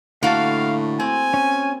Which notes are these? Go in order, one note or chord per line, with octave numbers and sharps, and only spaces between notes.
A2 D3 A#3 F#4 F5 A5
C4 G#5
C#4